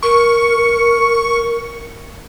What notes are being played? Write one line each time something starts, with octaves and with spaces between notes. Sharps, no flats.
A#4 C#6